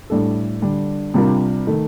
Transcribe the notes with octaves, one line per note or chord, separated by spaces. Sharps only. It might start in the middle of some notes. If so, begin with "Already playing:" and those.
A2 G3 D4 A4
D3 G3 D4
C3 G3 D4 F4 A#4
D#3 A3